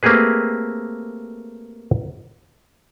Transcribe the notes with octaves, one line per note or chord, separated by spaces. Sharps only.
A3 A#3 C4 G4 G#4 B4